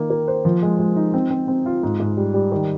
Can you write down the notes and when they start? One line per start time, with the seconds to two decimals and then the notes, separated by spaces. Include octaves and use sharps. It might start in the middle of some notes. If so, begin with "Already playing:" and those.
Already playing: D#3 A#3
0.10 A#3
0.28 C5
0.45 F3
0.63 G#3
0.79 G#3
0.96 D#4
1.14 C4
1.30 C4
1.48 C4
1.66 F4
1.83 G#2
2.00 G#2
2.17 G3
2.34 G3
2.52 D#3